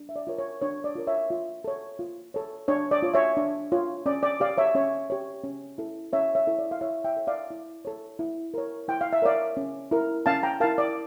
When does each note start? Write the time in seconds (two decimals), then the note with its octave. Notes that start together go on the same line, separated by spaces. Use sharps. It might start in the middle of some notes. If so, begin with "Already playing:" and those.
Already playing: D4
0.09 E5
0.16 D5
0.27 F4 A#4 C#5
0.38 C#5
0.62 D4 C#5
0.84 D5
0.95 F4 A#4 C#5
1.07 C#5 E5
1.30 F4
1.64 A4 C#5
1.99 F4
2.34 A4 C#5
2.68 D4 C#5
2.91 D5
3.02 F4 C#5
3.14 C#5 E5
3.37 D4
3.72 F4 C#5
4.06 C#4 D5
4.23 D5
4.40 G4 C#5 D5 F5
4.58 C#5 E5
4.75 C#4 C#5
5.10 G4 C#5
5.44 C#4
5.78 E4 A4
6.13 C#4 C#5 E5
6.35 C#5 E5
6.47 E4 A4
6.59 D5
6.71 F5
6.81 E4 C#5 E5
7.04 E5 G5
7.17 A4 C#5
7.27 D5 F5
7.50 E4
7.85 A4 C#5
8.19 E4
8.54 A#4 C#5
8.88 E4 G5
9.01 F5
9.13 E5
9.22 A#4 C#5 D5 F5
9.57 C#4
9.91 E4 A#4
10.26 C#4 F5 A5
10.43 G5 A#5
10.60 E4 A#4 F5 A5
10.78 D5